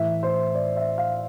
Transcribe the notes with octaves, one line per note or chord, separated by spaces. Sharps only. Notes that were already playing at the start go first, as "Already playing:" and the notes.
Already playing: A2 E3 E5
C5
D5
E5
F5